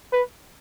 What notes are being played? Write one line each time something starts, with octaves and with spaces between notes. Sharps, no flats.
B4